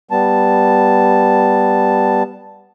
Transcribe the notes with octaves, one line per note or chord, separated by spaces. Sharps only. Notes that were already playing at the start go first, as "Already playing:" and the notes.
G3 B3 A5